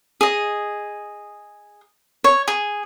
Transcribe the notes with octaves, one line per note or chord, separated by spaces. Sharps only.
G#4 D#5
C#5
G#4